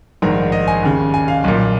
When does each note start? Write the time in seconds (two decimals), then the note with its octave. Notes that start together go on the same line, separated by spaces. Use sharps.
0.22 A#1 G#2 D#3 A#4
0.52 D#5
0.68 G#5
0.83 D#2 C#3
1.14 G#5
1.28 F5
1.44 B1 A#2